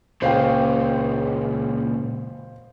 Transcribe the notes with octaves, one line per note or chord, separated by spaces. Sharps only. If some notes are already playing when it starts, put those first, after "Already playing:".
C#2 A#2 C#3 C5 F5 G5